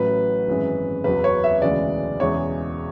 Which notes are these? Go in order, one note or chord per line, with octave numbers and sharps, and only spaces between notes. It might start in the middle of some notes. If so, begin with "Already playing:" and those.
Already playing: A1 A2 F#3 B4
G#1 F#2 E3 G#3
F#1 E2 C#3 F#3 B4
C#5
E5
E1 D2 C#3 E3 G#3 D5
E1 E2 C#3 E3 G#3 C#5